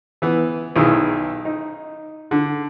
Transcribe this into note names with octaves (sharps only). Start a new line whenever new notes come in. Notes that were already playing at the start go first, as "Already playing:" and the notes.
E3 B3
B1 D#3 E4 G#4
D#4
D3